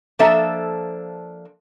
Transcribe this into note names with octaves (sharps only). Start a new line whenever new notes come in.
F3 A#3 D4 A4 E5